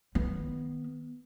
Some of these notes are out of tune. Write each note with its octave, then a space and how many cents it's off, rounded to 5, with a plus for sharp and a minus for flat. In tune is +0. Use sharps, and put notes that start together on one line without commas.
D#3 +0 B3 -5